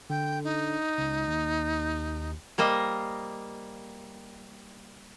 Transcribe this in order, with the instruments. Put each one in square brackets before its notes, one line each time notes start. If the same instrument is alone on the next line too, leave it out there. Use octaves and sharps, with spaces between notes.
[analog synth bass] D3 [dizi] G5
[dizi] D#4
[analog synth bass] C#2
D#2
[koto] G3 A#3 C5 D#5